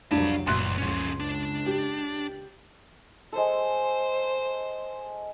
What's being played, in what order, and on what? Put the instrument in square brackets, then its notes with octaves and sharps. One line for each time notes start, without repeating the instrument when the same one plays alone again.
[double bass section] F1 C2 F#3 [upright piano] D4 [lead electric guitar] F5 B5
[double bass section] F#1 A#2 [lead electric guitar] C#2 [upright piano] C6 F#6
[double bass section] C#2 [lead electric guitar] F3 C#4
[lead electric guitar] D4
[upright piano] G4
[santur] G#3 A4 [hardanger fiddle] C5